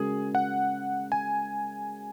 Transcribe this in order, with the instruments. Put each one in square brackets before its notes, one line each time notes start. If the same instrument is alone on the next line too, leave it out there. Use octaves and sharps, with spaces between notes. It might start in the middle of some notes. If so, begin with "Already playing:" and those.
Already playing: [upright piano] C#3 G#3 F#4 A#4 [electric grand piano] G#4
[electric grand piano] F#5
G#5